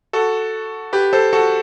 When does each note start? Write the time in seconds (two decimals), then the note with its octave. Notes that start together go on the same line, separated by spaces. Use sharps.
0.13 F#4 A4
0.93 G4 B4
1.13 A4 C5
1.33 F#4 A4